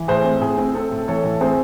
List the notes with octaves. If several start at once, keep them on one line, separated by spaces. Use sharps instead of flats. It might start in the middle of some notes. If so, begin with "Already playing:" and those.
Already playing: E3
A2 G#4 C5
C4
A2 G#4
C4
C4 A4
A2
E3 A4 C#5
A2
C4 G#4 C5